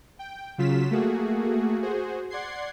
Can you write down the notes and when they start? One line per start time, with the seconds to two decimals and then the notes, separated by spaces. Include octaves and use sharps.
0.19 G5
0.58 C#3 F#3 F4 B6 E7
0.91 A3 A#3 F#4 G#4
1.82 F#4 G#4 C5
2.30 D5 F#5 C6 G#6 C7